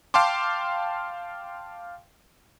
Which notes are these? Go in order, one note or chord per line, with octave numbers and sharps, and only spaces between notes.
F5 G5 A5 C6 D6